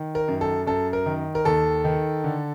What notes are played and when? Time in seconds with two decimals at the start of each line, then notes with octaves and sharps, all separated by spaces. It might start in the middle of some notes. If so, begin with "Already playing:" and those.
Already playing: D#3
0.15 A#4
0.28 F#2
0.41 A4
0.67 F#2 A4
0.93 A#4
1.06 D#3
1.35 A#4
1.45 D#2 A4
1.84 D#3
2.24 D3